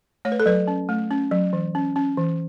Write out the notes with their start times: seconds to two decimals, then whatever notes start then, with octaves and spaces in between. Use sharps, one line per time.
0.25 A3 C#5
0.32 B4
0.40 A4
0.46 F#3 B4
0.68 C#4
0.89 A3
1.11 C#4
1.31 F#3
1.53 E3
1.75 C#4
1.96 C#4
2.17 E3